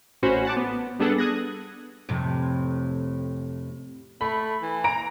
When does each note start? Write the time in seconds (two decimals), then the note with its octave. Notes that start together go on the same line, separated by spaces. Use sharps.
0.23 A1 C#4 F#4 C5 B5
0.45 F#5 A5 D6
0.57 B3
1.00 G3 B3 D4 G#4 A4 F#5
1.18 D#6 F#6 G#6 A#6
2.09 F2 A2 C3
4.21 A3 B5
4.62 E3
4.84 A#5 D7